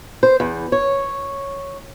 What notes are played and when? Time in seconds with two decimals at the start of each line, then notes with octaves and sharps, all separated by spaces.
0.23 C5
0.40 E2
0.72 C#5